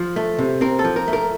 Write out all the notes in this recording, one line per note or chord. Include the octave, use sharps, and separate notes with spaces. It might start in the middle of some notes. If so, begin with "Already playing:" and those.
Already playing: F3
A3
C3
C4 A#4
A4
F3
A#4
A3
A#4